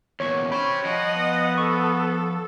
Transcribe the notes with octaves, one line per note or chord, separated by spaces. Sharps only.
E2 A#2 C#5 C#6
C#4 G4 C5 C#5 B5
F3 D#5 F#5
B3
A4 C#6